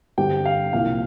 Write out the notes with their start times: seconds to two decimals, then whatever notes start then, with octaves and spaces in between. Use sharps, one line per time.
0.18 G2 D3 G3 C4 G4 G5
0.45 F5
0.73 C2 A#2 F3 A#3 F5